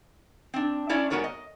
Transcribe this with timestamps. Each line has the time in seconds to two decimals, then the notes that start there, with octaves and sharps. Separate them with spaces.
0.54 C4 D4
0.89 C#4 D4 E4 C#5 D5
1.10 G#2 B3 F#4 A#4 C#5 D5
1.24 D#5